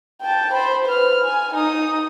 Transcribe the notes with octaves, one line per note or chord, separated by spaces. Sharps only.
G5 A5
C5 B5
B4 F6
G#5
D#4 D#6